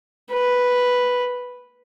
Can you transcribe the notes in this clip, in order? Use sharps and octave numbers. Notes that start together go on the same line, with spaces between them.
B4